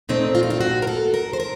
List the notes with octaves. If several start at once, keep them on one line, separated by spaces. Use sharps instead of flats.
A#2 A3 C4 D#4
F4
D#4
F4
F#4
A#4
A4
A#4
C5
A#4